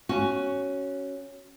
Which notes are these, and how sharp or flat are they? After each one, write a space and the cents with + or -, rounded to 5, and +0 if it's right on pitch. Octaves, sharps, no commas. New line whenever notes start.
C#4 +0 F#4 +15